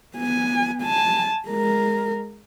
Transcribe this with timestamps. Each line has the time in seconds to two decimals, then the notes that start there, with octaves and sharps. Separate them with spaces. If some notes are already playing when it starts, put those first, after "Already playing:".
0.16 B3 G#5
0.82 G#5 A5
1.48 G#3 A#4